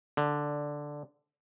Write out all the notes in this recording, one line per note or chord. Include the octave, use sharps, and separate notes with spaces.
D3